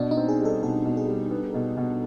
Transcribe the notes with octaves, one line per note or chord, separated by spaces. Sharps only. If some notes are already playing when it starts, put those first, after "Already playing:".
Already playing: B2 D4
D#4
C4
G#4
G3
A4
B2 A4
B2
G#4
G3
B3
B2
B2